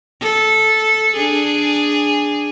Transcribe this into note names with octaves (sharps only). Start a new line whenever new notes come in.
A4
D4 G#4